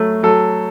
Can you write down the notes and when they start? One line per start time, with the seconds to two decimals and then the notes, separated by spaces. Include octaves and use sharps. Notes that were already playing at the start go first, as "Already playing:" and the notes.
Already playing: F#3 A3
0.23 F#3 A4